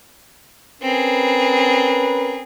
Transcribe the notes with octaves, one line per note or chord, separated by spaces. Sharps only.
C4 C#4 G#4 A#4 B4